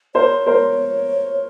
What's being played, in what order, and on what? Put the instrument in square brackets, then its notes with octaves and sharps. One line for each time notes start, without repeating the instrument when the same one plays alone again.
[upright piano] A#4 C5 [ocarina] C#5
[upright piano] A#4 C5